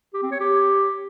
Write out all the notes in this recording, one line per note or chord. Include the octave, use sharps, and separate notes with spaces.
G4
C4
C#5
G4